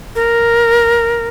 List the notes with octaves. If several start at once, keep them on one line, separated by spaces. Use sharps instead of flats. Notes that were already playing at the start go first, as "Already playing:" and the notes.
A#4